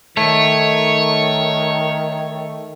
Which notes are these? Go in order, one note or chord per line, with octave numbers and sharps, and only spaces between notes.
D#3 A3 C#5